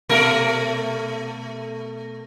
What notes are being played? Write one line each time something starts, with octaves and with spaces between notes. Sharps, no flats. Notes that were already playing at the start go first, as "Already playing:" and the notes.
B2 A3 A#4